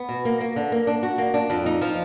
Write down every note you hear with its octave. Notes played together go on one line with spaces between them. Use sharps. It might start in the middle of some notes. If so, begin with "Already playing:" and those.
Already playing: B3
B2
A#3
A#3
D3
A#3
D4
F#4
A#3
D4
F2
D#4
F3